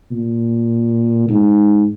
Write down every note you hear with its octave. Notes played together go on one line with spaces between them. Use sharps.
A#2
G#2